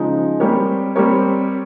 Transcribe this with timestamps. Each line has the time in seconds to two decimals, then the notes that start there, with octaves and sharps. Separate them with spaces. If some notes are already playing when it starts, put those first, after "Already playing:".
Already playing: C#3 F3 G#3 D#4
0.40 G3 C4 G4 A#4 C#5
0.96 G3 C4 G4 A#4 C#5